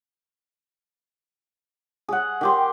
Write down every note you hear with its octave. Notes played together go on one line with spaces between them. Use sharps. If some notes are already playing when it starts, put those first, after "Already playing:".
G#4 F#5
D#3 G4 C6